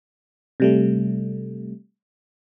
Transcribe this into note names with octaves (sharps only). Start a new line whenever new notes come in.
C3 G3 A3